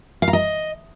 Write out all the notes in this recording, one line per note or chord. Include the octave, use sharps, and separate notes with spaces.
F5
A#5
D#5